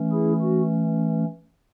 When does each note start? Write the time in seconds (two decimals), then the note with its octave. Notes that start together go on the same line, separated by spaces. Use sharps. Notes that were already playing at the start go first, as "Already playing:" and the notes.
Already playing: E3 A3 C#4
0.12 E4 G#4
0.42 F#4